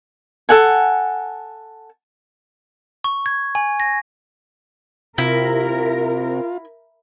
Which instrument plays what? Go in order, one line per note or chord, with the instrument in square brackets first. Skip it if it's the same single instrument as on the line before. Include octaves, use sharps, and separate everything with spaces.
[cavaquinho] A4 F#5 G#5
[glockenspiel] C#6
G#6
G#5
A#6
[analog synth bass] C3 [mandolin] E4 [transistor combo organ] F4 [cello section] A#4